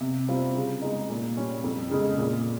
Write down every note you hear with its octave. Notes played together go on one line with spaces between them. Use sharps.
C3
G3 C4 F4
C#3
G#3 D#4
A#2
G3 C#4
F2
C#3 G#3
A#2